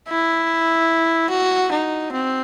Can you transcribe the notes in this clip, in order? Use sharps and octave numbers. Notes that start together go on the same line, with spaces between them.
E4
F#4
D#4
C4